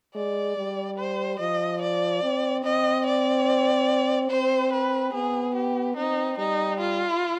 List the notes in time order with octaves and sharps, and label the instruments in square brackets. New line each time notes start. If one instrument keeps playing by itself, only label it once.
[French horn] G#3 [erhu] D5
[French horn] G3
[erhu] C5
[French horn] F3 [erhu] D#5
[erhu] D5
[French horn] C4
[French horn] C4 [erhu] D#5
[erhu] D5
[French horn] C4 [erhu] C5
[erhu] B4
[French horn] B3 [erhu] G#4
[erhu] G4
[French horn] C4 [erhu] D#4
[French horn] G3 [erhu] D#4
[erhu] F4